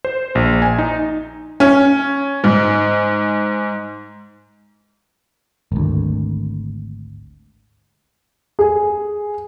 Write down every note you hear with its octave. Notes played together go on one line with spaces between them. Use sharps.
C5
A#1
G#5
D#4
C#4
G#2
G#1 D2
G#4